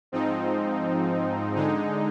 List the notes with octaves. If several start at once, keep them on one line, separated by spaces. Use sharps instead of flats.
G#2 F3 C4 D#4
D3 G#3 D#4